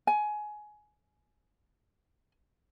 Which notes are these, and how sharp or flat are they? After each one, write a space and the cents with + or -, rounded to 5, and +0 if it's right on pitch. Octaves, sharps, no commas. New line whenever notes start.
G#5 +20